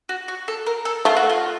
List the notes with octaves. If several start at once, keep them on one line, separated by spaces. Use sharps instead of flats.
F#4
F#4
A4
A#4
A4
A3 F4
F#4
F4